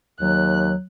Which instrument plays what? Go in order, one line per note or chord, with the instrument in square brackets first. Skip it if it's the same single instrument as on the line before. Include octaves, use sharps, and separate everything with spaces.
[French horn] D#2 [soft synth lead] F#3 [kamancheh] F#6